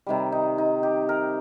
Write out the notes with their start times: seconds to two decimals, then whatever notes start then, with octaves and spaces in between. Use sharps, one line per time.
0.06 C3 D#3 G3
0.32 D#4
0.58 D#4
0.83 G4
1.09 A#4